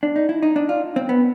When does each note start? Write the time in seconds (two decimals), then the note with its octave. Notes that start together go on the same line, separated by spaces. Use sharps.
0.03 D4
0.16 D#4
0.29 E4
0.43 D#4
0.56 D4
0.69 F4
0.96 C4
1.09 B3